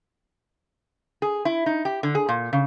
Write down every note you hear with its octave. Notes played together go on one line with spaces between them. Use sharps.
G#4
E4
D#4
G4
D3
G#4
A#2
C#3